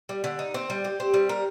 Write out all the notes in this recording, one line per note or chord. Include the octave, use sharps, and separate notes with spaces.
G3
D3
D#4
C4
G3
G4
C4
G3
A#4